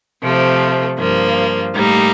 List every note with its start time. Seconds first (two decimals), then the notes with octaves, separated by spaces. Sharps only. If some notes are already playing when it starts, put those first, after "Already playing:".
0.23 C3 F3 A3
0.98 G2 F3 A#3
1.74 A2 G3 A#3 D#4